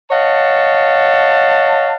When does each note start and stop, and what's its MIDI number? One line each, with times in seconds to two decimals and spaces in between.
0.11 1.96 73
0.11 1.96 75
0.11 1.96 77
0.11 1.96 78
0.11 1.96 81